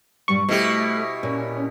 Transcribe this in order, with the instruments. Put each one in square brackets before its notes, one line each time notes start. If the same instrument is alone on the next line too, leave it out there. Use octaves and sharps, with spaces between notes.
[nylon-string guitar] G2 A#2 G3 [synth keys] C#6
[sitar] B2 E4 G4 [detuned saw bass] A3 [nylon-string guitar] C5
[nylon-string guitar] A#2 [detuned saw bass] C#4